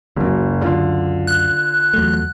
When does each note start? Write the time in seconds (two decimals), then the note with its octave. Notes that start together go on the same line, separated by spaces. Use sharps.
0.16 F#1 C#2 F#2
0.61 D3 F4
1.27 F#6
1.94 E2 F#3 A3